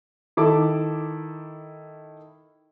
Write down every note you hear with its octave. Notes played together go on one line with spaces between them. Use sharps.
D#3 E4 A4 A5 D6